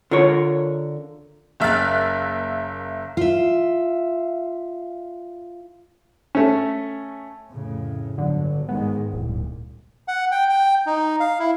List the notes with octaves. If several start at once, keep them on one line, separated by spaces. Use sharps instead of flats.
D3 F4 A#4 C#5
F#1 A#3 E5 F6 F#6 A6
F4 E5
A3 C#4
F1 A2 C#3
G1 D3 F#3
G#2 D#3 G#3 B3
D1 C2 A#2
F#5
G5
G5
D#4
F5
E4